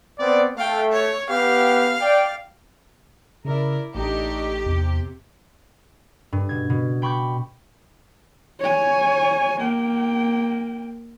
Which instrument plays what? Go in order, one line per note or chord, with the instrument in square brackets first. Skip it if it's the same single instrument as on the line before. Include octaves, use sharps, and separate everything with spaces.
[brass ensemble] B3 C4 D5
[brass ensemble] A3 [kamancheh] F5 G5
[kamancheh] C#5
[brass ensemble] B3 G4 [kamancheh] F5
[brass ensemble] D5 G5
[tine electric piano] C#3 [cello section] E4 A#4 D5
[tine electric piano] A1 [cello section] A3 D4 D#4 [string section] G4
[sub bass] E2 [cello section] C3
[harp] G2
B2 G#6
B2
G5 B5 C#6 D6 G6
[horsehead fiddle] C#5 G#5
A#3 G5